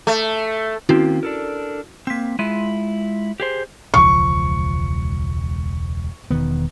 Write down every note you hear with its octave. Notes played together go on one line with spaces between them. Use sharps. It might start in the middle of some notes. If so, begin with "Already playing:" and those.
A3
D#3 A#3 C4 C#4 E4 F#4
D4 A4 A#4
A#3 C4 C6 B6
G#3 E4 F4 D#7
G4 G#4 C5
E1 C#2 F3 C#6
E1 D#3 B3